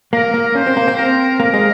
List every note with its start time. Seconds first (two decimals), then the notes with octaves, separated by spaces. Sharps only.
0.13 A#3 A#4
0.34 A#3
0.55 C#4 C5
0.67 C4
0.77 A#3
0.88 C4
0.97 A#4
1.40 A#3 A#4
1.54 G#3